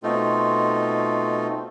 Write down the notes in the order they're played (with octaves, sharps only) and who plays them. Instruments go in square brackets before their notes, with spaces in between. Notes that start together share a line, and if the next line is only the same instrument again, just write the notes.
[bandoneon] B2 A3 C4 D#4 F4